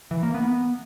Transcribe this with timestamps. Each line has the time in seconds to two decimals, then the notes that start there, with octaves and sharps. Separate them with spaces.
0.11 E3
0.23 A#3
0.34 B3